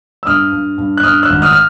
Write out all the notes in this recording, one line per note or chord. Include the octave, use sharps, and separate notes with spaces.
E6
G2 D#6 F6
G2
G2
F#6
G2 D#6 F6
E6 F#6
G#1
D#6 F6
F6